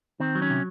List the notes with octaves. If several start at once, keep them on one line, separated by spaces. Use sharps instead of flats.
D#3 C4
F#3
C#4
C3